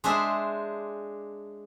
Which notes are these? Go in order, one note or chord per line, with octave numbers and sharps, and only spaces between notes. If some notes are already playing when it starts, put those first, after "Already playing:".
G#3 D4 G#4 C5 E5